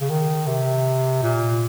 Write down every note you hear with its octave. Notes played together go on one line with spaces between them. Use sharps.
C#3
D#3
C3
A#2